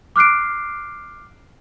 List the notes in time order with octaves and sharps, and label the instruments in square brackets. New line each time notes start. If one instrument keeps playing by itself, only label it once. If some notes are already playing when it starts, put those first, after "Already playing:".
[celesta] D6 F6 F#6 C7 D7